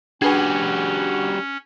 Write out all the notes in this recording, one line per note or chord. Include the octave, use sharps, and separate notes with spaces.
G3 C#4 D4 F#4 G#4 B4 G#5